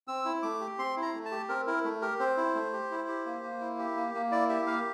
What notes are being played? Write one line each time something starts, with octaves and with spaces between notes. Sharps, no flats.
C4 E6
E4
A3 D6
G4
C4 C6
E4
A#5
A3
A5
G4
C4 A#4
E4 A#4
A3
G4 A#4
C4 C5
E4
A3
G4
E4
G4
A#3
A#3
E4
G4
A#3
A#3
E4 D5
G4 E5
A#3 F5